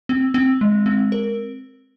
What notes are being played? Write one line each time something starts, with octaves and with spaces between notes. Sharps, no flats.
C4
C4
G#3
C4
A#4